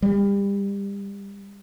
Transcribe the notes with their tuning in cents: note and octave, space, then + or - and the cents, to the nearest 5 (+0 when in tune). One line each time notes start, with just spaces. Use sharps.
G3 +30